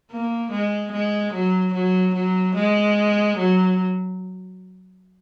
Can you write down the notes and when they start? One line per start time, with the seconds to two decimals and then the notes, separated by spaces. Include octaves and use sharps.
0.11 A#3
0.51 G#3
0.92 G#3
1.33 F#3
1.74 F#3
2.15 F#3
2.55 G#3
3.37 F#3